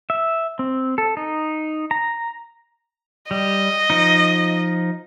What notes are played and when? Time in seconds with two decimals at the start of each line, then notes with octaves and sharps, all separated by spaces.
0.10 E5
0.59 C4
0.98 A4
1.17 D#4
1.91 A#5
3.31 G3 D#5
3.90 F3 D#4